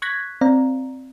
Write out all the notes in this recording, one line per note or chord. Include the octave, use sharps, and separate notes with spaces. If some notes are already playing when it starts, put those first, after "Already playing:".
C#6 F#6 G#6 A#6 B6
C4 D5 F5 A#5